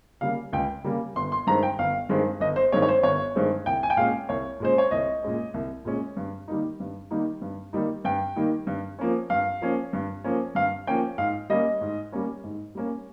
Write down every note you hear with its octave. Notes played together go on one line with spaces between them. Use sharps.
C#3 G3 A#3 F5
C#2 G5
C#3 G3 A#3
G1 C6
C6
G2 D#3 G#3 C4 A#5
G5
G1 F5
G2 D#3 G#3 C4
G1 D#5
C5
G2 D#3 G#3 C4 C#5
C#5
C5
G1 C#5
G2 D#3 G#3 C4
C2 G5
G#5
G5
A#2 G#3 C#4 F5
C2 C#5
A#2 G#3 C#4 C5
C#5
C2 D#5
A#2 G#3 C#4
C2
A#2 G#3 C#4
G2
D#3 G3 A#3 D#4
G2
D#3 G3 A#3 D#4
G2
D#3 G3 A#3 D#4
G2 G5
D#3 G3 A#3 D#4
G2
F3 A#3 C#4
G2 F5
F3 A#3 C#4
G2
F3 A#3 C#4
G2 F5
F3 A#3 C#4 G5
G#2 F5
G3 A#3 C#4 D#5
G#2
G3 A#3 C#4
G#2
G3 A#3 C#4